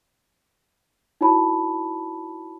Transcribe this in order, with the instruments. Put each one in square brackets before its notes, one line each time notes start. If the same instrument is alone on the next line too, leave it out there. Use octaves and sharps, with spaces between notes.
[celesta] D#4 E4 F#4 C#5 A5 B5